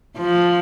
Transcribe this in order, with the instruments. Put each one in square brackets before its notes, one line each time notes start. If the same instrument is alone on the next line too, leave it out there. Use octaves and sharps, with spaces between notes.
[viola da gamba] F3